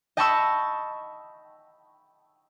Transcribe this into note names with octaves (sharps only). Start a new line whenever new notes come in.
D#5 G5 A5 B5 C#6 E6